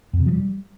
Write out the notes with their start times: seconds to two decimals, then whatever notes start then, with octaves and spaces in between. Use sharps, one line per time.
0.13 F2
0.20 C3
0.26 F3
0.33 G3